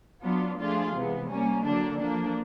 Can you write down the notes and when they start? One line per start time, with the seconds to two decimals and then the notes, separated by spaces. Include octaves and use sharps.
0.23 F#3 B3 D4 F4
0.58 F3 A3 D4 F4 G#4
0.94 C3 E3 G#3 B3
1.29 G3 A#3 C#4
1.65 D3 F#3 A#3 D4
2.00 F3 A#3 D4